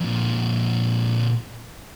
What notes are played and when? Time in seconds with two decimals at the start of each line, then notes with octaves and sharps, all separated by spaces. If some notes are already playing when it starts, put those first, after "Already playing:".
0.01 F2 A#2